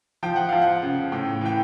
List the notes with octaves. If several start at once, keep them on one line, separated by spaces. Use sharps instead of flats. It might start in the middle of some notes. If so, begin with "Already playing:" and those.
F3 G5
F#5
F3 F5
F#5
C#3
A2 G5
E3 G5